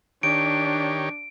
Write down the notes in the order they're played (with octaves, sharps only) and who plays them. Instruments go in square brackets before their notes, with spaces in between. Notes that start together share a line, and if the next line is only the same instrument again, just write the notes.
[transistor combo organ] D#3 G4 C#5 [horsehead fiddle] D4 [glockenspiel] D7